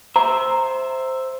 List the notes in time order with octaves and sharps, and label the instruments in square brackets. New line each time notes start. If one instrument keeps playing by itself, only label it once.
[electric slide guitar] C5 E5 [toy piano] A#5